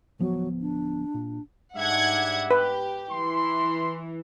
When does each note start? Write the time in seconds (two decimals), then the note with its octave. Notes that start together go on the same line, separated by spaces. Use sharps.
0.19 D1 F3 F#3 B3
0.61 D4
1.14 A#2
1.76 G#2 G3 D4 E5 F#5 G#6
2.51 G4 B4
3.11 E3 C6